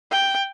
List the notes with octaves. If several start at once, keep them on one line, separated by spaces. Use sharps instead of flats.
G5